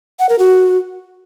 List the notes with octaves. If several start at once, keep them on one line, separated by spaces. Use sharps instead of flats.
F#5
A#4
F#4